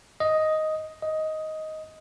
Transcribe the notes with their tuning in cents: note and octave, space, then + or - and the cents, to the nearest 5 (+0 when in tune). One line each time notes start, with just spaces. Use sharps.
D#5 +5
D#5 +10